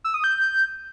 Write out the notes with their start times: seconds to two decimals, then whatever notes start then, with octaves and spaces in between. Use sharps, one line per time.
0.04 E6
0.14 D#6
0.24 G6